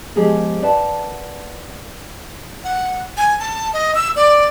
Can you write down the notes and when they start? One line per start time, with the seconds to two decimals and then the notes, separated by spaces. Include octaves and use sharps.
0.16 F3 G#3 B3 G4 G#4 A#4
0.62 A#4 B4 D5 E5 F#5 A5
2.64 F#5
3.17 G#5
3.40 A5
3.73 D#5
3.95 E6
4.16 D5